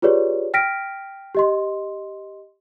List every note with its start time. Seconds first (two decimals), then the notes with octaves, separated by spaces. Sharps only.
0.02 F4 G4 G#4 B4 C#5 D5
0.54 G5 F6 A#6 B6 D7
1.35 G4 D#5 C6